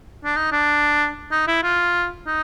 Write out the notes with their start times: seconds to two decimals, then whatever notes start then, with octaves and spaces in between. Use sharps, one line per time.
0.24 D4
0.36 D#4
0.52 D4
1.31 D#4
1.47 E4
1.63 F4
2.27 D#4